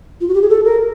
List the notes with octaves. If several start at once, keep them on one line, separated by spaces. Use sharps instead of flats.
F4
F#4
G4
G#4
A4
A#4